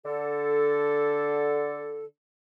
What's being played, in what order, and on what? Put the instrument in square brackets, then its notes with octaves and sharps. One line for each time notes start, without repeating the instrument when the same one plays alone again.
[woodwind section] D3 A4